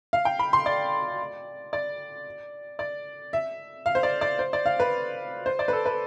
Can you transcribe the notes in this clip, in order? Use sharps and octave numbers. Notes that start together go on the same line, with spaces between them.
F5
G5
B5
C6
D5
D5
D5
E5
F5
C5
D5
D5
C5
D5
F5
B4
C5
D5
B4
A4
B4